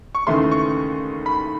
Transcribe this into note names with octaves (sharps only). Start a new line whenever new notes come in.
C#6
D#2 C#3 E3 A3 C6
C#6
B5